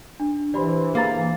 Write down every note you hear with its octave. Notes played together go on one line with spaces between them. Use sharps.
D4
E3 G4 C5 D5 B5 C6
A#3 G#4 E5 F5 A#5 A6